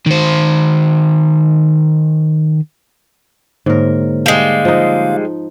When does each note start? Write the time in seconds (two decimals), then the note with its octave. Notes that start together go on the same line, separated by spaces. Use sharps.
0.06 D#3 C5
3.66 G#2 D3 A#3 A#4 C#5
4.26 G3 G#3 F5
4.65 F3 D#4